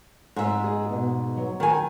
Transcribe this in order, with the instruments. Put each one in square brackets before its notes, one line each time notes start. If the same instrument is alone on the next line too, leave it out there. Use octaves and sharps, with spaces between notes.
[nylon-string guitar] G#2 E5
[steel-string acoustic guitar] G#4 D#5
B2 B3
F#3
[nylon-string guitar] D#3 G#5